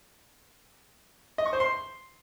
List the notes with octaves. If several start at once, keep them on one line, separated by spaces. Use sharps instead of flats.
D#5
C#6
C5
C6